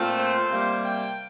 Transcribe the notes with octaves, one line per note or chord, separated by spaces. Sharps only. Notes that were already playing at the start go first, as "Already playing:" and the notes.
Already playing: A#2 A3 C4 F4
C5
C3 G3 A#3
G5